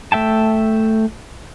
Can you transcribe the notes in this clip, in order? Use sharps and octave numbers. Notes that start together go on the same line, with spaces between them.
A3 E5 G5 A5